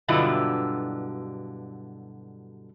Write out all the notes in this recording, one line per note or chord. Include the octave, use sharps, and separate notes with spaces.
G2 B2 D3 F#3 E4 F4